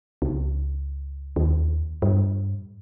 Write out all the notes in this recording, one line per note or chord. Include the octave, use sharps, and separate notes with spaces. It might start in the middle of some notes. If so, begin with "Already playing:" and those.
C#2
D#2
G2